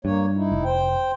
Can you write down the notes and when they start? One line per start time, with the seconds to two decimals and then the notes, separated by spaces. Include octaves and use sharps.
0.05 G2 A#3 C#5
0.35 D#4 E4
0.52 F1
0.64 C5 G5